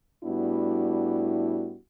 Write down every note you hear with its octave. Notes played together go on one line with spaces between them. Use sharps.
A2 G3 B3 D4 E4 F#4